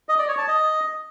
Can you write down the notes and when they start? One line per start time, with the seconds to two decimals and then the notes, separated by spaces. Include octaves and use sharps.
0.09 D#5
0.19 D5
0.28 C#5
0.38 A5
0.48 D#5